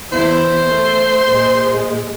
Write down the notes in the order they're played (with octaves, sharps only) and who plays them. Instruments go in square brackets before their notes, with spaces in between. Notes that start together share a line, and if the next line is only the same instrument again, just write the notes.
[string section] E2 E4 [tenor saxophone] C5
[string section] A3
A#2 G#3